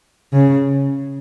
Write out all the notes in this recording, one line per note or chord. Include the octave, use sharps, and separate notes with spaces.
C#3